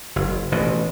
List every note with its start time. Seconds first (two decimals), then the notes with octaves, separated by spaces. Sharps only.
0.16 F#1
0.52 A1 B2